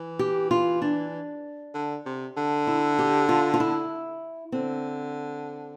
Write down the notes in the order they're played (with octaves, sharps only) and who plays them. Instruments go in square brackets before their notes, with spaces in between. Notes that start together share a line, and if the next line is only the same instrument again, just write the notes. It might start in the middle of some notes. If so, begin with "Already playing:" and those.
Already playing: [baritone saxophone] E3
[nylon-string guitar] G4
F4
D4
[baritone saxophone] D3
C3
D3
[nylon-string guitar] E4
G4
F4
F4
E4
[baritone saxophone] D3 [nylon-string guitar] C4